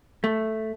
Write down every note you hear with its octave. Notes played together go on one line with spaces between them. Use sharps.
A3